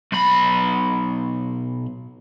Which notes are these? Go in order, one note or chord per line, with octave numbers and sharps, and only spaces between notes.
B1 B5